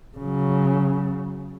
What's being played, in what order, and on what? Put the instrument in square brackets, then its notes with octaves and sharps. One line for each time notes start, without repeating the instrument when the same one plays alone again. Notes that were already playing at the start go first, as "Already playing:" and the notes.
[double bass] C#3 F#3